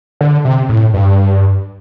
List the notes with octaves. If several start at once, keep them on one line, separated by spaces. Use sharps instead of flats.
D3
C3
A2
G2